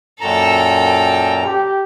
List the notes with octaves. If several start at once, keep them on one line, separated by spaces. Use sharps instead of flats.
F#2 A#2 A4 G5 A#5
G4